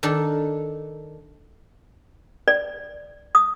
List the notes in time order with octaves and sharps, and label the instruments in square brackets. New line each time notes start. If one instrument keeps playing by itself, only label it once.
[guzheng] D#3 D4 A4
[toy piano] D5
D#6